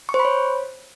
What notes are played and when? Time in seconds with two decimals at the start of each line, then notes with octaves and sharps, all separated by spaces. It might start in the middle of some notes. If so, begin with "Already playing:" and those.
0.09 C#6
0.14 C5
0.19 B5
0.25 C#5